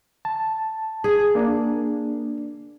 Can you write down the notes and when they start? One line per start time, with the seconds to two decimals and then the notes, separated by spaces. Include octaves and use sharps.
0.25 A5
1.04 G#4
1.35 A#3 D4